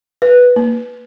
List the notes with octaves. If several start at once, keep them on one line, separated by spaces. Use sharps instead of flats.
B4
A#3